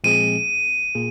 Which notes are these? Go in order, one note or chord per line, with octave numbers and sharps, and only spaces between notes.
A#2 F3 G#3 C4 G#4 D#7
A#2 A#3 G#4